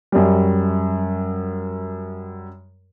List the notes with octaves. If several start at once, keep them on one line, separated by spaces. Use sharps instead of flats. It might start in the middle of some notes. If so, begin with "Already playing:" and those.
F#2 G3